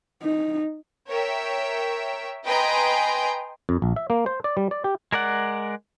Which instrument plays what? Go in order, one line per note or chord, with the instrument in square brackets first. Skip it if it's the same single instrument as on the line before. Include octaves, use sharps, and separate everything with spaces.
[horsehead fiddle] D#4
[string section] A#4 C#5 E5 G5
B4 D#5 G5 G#5 A#5 C6
[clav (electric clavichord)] F2
A#1
E5
A#3
C5
D5
G3
D5
G4
[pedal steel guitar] G#3 A#4 D5 F#5